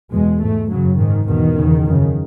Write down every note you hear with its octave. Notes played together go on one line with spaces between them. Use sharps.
E2 B2 G#3
G#2 A3
F#2 C#3 F#3
G#2 D#3
E2 B2 D#3
E2 C#3
F#2 C#3